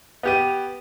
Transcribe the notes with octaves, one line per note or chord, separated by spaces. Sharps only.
B3 G4 D#7